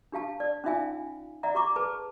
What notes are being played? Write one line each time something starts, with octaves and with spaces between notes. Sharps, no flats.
D4 G4 F5 A5
D5
C#4 D#4 F4 E5 F5 G#5
D5 E5 F#5 A#5
G4 A#5 C#6 D6
G#4 B4 A5